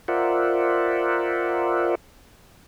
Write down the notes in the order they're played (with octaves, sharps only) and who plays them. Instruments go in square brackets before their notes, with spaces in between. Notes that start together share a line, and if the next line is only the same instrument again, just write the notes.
[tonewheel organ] F4 A#4 C5 D5 E5 F#5